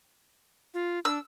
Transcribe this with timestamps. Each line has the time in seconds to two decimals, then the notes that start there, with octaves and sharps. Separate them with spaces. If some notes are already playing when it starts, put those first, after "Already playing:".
0.74 F4
1.05 D4 E6